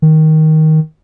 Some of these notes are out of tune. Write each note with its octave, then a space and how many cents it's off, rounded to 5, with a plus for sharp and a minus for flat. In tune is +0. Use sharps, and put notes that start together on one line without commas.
D#3 +10